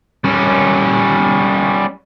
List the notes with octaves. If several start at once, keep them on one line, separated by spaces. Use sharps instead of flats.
G3 C#4